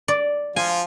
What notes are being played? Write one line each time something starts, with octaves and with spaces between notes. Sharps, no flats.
D5
F3 F4 G#5